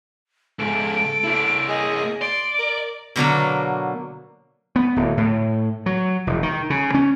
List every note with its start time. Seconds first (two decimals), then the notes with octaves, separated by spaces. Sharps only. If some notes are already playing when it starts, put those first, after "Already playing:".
0.59 C#2 G#2 A4 D7
1.24 A#3 E4
1.68 G#4 D#5
2.21 D5 C6 D7
2.59 A#4 A#5
3.16 B2 D3 F#3 A#3
4.76 B3
4.96 D1
5.17 A2
5.86 F#3
6.27 E1
6.43 D#3
6.70 C#3
6.94 C#4